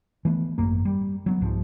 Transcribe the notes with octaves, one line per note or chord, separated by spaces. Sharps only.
E3 A3 B3
G#1 F#2 A#3
G3
F#3 A#3 B3
C2 G#2 F3